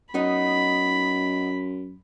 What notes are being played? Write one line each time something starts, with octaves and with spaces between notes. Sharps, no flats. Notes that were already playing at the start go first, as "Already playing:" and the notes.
F#2 B3 D#4 D#5 B5